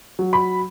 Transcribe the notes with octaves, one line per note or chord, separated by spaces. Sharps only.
F#3
B5